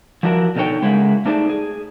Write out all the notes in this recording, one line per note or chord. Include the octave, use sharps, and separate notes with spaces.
F3 D4 E4 F#4 A#4
B2 D3 D#4 A4 C#5 G5
C#3 G#3 A#3 E4 G#4 F#5
A3 D4 D#4 G#4 C5 D5
G#4